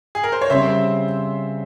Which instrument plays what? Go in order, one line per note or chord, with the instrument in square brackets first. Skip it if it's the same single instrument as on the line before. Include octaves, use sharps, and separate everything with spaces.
[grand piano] G#4
A#4
C5
C#5
[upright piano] C#3 G3 C4 [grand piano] C5 E5